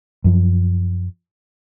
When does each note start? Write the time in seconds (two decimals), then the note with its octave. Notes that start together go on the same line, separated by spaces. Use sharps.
0.24 F#2 F3